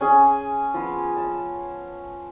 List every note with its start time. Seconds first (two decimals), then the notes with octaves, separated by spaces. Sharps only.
0.01 C#4 G#4
0.74 F3 B3
1.16 A5